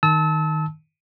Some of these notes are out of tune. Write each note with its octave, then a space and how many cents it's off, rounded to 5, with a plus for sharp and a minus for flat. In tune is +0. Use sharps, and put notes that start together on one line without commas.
D#3 +0 A5 -10 E6 -35